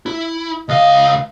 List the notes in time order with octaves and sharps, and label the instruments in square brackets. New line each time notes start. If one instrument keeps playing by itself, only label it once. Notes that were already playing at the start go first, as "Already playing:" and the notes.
[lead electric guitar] E4
[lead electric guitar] C#2 F5 [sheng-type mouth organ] D#5